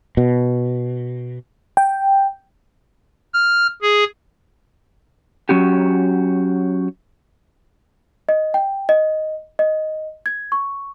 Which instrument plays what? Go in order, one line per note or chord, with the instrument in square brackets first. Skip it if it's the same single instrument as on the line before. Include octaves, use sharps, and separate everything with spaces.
[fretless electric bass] B2
[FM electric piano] G5
[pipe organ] F6
G#4
[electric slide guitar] F#3 C#4 F#4 G4
[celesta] D#5
G5
D#5
D#5
G#6
C#6